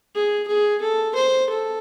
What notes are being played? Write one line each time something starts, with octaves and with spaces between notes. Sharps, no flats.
G#4
G#4
A4
C5
A4